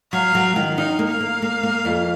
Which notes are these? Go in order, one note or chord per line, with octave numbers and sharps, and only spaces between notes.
F#3 F5
F#3
D#3
D#4 F5
A#3
F5
A#3
A#3
A#3
F2